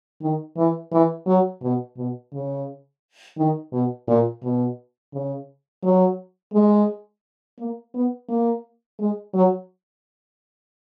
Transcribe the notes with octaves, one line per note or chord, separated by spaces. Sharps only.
D#3
E3
E3
F#3
B2
B2
C#3
D#3
B2
A#2
B2
C#3
F#3
G#3
A#3
B3
A#3
G#3
F#3